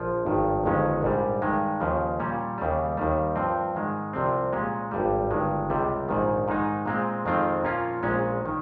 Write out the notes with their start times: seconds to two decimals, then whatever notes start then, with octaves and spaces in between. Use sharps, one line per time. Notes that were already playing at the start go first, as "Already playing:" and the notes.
Already playing: A#1 F3
0.25 G#1 G2 D#3
0.64 G1 F2 D#3 G#3 C#4
1.02 A#1 G#2 G3
1.42 G2 D#3 G#3
1.80 D#2 C#3 F3
2.20 A#2 G3 C#4
2.58 D#2 C#3 G3
2.97 D#2 D#3 G3
3.36 G2 F3 C4
3.75 G#2 D#3 G#3
4.13 C2 C3 F3 C4
4.53 A#2 G#3 C#4
4.91 G#1 G2 G3
5.30 G1 G2 D#3 G#3
5.70 C#2 C3 G3
6.09 A#1 G#2 D#3
6.48 G#2 D#3 G#3 D#4
6.86 A#2 G#3 C4
7.26 F2 D#3 G#3 C4 F4
7.63 A#2 F3 A#3 C#4 F4
8.03 A#1 A#2 G#3 C#4
8.46 D#3